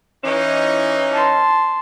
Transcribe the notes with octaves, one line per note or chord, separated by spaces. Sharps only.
E3 C#4 D#4
A5 C6